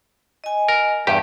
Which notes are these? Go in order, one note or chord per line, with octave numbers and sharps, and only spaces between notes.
D#5 G#5
A#4
E2 G2 G4